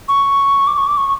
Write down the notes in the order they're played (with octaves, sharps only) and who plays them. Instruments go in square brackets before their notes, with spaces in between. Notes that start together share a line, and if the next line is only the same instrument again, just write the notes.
[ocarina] C#6
D6
C#6
D6
C#6